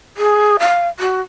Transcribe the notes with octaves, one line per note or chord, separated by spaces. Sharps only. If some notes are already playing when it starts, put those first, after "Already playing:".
G#4
F5
F#4